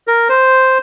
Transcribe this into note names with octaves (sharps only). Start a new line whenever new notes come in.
A#4
C5